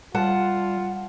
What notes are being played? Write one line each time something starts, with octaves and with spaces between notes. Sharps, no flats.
G3 F4 F#5 A5